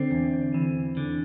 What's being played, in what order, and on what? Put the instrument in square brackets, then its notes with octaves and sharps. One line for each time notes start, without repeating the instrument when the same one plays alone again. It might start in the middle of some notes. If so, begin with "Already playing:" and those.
Already playing: [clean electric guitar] D3 C4
E2
E3
D3